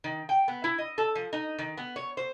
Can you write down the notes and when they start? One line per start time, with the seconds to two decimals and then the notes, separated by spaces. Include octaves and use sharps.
0.04 D#3
0.29 G5
0.48 B3
0.64 E4
0.78 D#5
0.98 A4
1.15 F3
1.33 D#4
1.59 D#3
1.77 B3
1.96 C#5
2.17 C5